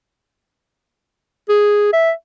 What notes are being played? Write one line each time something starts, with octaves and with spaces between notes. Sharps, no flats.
G#4
E5